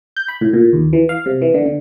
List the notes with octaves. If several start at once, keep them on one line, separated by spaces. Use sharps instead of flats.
G6
B5
A2
A#2
D#2
E3
F5
C3
E3
D3
D3